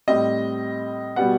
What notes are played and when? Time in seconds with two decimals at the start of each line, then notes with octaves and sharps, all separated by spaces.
0.07 A2 G3 C4 D#5
1.16 B2 G3 B3 F#5